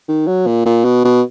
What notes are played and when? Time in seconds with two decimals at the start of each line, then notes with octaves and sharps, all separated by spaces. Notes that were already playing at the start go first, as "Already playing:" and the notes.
0.08 D#3
0.27 F#3
0.47 A#2
0.66 A#2
0.84 B2
1.04 B2